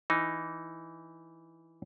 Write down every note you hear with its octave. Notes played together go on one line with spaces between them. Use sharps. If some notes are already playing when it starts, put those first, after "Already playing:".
E3 D#4